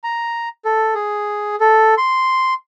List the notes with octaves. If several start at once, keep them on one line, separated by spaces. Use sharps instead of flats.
A#5
A4
G#4
A4
C6